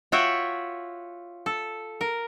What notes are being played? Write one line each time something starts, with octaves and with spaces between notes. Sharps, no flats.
F4 F#4 C#5 E5 F#5 G5
A4
A#4